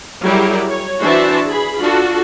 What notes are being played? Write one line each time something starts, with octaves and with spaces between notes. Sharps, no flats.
F#3 G3 E4 G4 G#4 A#4
C#5
E3 D4 F#4 C5 E5 A5
G#4 B5
D4 F4 F#4 A4